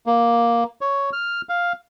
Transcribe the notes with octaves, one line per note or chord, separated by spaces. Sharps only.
A#3
C#5
F6
F5